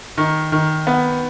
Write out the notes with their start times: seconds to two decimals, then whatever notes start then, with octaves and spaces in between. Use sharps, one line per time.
0.18 D#3
0.52 D#3
0.87 B3